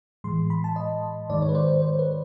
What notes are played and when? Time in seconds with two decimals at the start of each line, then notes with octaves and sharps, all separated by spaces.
0.24 A2 E3 G#3 C6
0.50 B5
0.64 A5
0.76 D#5
1.30 G#2 D#3 G#3 D5
1.42 C#5
1.49 B4
1.55 C5
1.68 C5
1.82 C5
1.99 B4